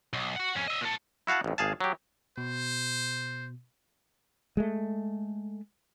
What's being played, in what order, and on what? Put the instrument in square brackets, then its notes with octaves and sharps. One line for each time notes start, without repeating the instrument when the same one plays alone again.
[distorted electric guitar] B1
F#4 F#5
F2 C#4
D#5 E5
A#2 A4
[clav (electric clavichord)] E4 F#4 F5 F#5 A5
A1 F2
G#1 G#4 F5 A5
F#3 G4
[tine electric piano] B2 [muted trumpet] C5
[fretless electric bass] G#3 A3